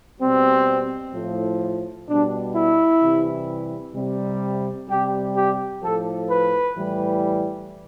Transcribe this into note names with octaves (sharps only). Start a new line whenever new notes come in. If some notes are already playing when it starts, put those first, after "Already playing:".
B2 G3 C4
A2 F3
B2 G3 D4
E4
C3 E3 G3
C3 G3
C3 G3 G4
G4
A2 F3 A4
B4
A2 E3 G3